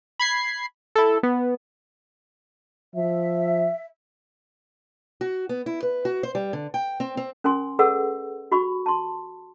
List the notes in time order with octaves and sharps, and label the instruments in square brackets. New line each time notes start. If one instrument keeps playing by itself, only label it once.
[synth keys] B5 G#6 C7
E4 A4
B3
[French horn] F3 [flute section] E5
[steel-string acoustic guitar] F#4
B3
E4
B4
F#4
C5
G3
D3
G5
C4
C4
[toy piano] C#4 A#4 G#5 C6
G#4 A4 B4 D5 F#5 E6
F#4 G4 B5 C#6
A5 C6